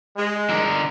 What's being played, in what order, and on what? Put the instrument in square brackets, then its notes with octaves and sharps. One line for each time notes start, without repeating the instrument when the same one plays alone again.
[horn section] G#3
[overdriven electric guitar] D3 A#4